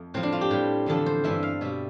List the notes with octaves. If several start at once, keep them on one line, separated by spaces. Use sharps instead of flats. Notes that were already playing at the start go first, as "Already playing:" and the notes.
Already playing: F2 A3
A2 F3 C4
D4
F4
G4
A2 G3
E2 D3 F3 A4
C5
G2 E3 G3 E5
F5
B2 G3 E5